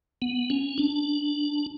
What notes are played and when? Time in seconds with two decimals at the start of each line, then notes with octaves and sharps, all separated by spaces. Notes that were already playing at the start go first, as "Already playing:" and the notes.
0.22 B3
0.50 C#4
0.78 D4